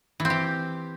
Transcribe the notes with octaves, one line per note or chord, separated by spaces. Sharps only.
E3
C4
G4